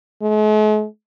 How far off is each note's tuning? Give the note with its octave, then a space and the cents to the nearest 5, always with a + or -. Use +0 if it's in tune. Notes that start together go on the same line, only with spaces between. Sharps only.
G#3 +45